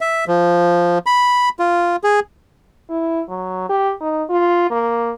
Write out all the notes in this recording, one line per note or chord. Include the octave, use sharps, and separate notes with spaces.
E5
F3
B5
F4
G#4
E4
F#3
G4
D#4
F4
A#3